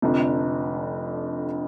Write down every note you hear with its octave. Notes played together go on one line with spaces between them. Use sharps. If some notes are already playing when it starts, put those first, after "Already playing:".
F1 F2 D3